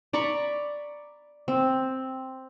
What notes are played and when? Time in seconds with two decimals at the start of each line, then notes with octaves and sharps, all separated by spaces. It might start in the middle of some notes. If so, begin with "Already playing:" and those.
0.13 D5 A#5 B5 C#6
1.48 C4